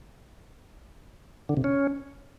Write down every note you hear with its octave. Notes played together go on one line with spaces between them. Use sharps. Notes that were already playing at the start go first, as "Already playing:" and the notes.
D3
C3
C#4